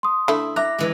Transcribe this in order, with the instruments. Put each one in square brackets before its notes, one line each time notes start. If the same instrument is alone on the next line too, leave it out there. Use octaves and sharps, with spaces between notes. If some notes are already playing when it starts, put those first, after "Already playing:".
[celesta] C6 D#6
[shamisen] D3 A3 [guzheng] E4
[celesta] E5 D6 F#6 [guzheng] A#5
[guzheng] E3 G#3